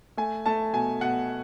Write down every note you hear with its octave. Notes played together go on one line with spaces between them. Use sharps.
A3 G#5
A3 A5
B2 G#5
B2 F#5